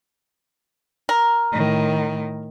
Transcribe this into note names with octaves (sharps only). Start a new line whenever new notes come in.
A#4
A2 D#3